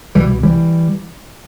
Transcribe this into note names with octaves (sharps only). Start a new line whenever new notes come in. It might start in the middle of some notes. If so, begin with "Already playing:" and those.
C2 B2 E3 G3
E3 G3